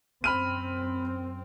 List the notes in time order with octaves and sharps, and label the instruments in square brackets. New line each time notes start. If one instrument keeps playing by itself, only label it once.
[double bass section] F#2 C4 [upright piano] B5 F6 D#7